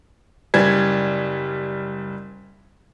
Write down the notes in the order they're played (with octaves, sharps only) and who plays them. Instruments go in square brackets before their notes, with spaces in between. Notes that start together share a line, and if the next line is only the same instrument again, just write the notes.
[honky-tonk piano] F#1 G3 G#6